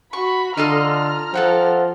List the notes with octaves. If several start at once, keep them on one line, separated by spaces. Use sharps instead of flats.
F#4 B5 C#6
D3 F4 A4 D#5 A#5 F6
F3 A4 F#5 G5